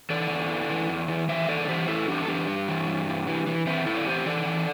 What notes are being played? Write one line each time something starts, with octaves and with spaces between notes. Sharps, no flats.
E3 A4 D5
E2
E3
E3
E2
E3
E3 C5 E5
E2 A4 D5
A4
E3 G4 C5
E2 E4 A4
E2 D4 G4
A4
E2 D4 G4
G2
E3
G2
E3
E3
E3
E3 C4 E4
E2 E4 A4
D5
E2 G4 C5
E3 A4 D5
E3